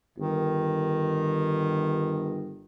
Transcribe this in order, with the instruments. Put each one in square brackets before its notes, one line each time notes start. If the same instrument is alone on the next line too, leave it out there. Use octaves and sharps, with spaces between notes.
[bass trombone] G1 [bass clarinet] D#3